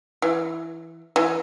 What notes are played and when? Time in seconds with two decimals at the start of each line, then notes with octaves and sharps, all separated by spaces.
0.22 E3
1.16 E3